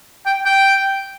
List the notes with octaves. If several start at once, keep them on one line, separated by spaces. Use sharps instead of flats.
G5
G5